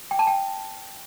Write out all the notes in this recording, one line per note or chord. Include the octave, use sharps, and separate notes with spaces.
G5
A5
G5